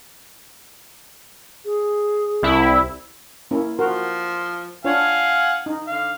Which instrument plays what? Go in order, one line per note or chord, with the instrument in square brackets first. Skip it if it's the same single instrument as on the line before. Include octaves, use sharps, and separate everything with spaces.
[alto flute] G#4
[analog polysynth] C2 E4
[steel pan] A#3 C#4 E4
[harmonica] F3 C5 [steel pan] F#4 A#4
[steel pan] D4 F4 C#5 [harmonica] F5 F#5 G#5
[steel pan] D#4
[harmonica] D3 F5